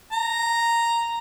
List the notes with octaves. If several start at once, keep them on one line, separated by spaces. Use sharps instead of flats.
A#5